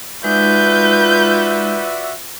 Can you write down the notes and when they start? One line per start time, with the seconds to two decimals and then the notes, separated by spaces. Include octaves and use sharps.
0.24 G#3 D#4 F4 F#4 B4 D5 E5 G6